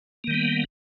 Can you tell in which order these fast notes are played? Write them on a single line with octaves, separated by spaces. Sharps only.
A#3 D#3 G3 B3